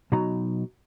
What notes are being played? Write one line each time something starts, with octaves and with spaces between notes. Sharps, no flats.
B2 F#3 D#4 A#5